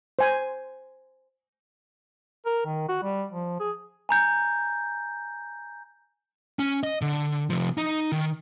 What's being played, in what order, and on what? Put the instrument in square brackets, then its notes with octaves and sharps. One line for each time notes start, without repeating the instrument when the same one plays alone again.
[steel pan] C5 G#5
[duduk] A#4
D#3
F#4
G3
F3
G#4
[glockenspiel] G#5 A#5 G6
[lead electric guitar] C#4
D#5
D3
C3 F3
D#4
D#3